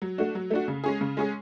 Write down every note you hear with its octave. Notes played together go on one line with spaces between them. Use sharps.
F#3
A3 D4 F#4
F#3
A3 D4 F#4
C#3
G#3 C#4 G#4
C#3
G#3 C#4 G#4